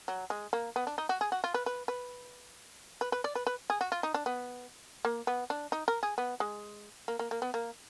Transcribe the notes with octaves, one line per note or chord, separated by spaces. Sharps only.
F#3
G#3
A#3
B3
D4
D#4
F#4
G#4
F#4
F4
B4
B4
B4
B4
B4
D5
B4
B4
G#4
F#4
F4
D#4
D4
B3
A#3
B3
D4
D#4
A#4
G#4
B3
G#3
A#3
A#3
A#3
B3
A#3